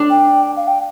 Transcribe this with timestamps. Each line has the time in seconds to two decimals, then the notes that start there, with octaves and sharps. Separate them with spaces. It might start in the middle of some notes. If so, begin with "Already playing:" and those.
Already playing: D4
0.10 G5
0.57 F5
0.67 G5